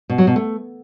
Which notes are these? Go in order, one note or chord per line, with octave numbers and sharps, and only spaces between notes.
B2
F#3
B2
A3